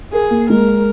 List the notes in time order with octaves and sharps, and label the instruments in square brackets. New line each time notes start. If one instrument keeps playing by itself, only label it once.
[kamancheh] G#4 [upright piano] A#4
[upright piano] A#3
[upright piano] G#3 [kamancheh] A#4